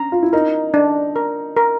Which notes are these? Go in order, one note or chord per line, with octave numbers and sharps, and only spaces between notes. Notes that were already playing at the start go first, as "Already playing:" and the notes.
Already playing: C#4 D4 A#5
F4
E4
D#4 A#4
D4
A#4
A#4